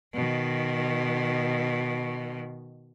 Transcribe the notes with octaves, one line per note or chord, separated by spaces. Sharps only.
B2 D#3